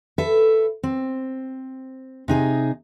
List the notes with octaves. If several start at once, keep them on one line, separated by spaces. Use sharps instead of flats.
A4 B4 E5
C4
C3 D#4 G#4